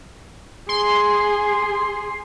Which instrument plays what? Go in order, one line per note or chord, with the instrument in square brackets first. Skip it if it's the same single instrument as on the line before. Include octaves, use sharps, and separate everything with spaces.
[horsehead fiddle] G#4 [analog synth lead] C6